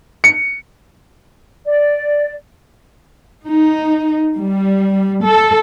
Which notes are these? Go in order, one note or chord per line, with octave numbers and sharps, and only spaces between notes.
C#7
D5
D#4
G3
A4